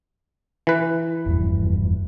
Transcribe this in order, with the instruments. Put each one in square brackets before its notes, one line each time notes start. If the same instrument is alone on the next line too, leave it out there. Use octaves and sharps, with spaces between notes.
[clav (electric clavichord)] E3 B4
[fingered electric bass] F1 E2 G2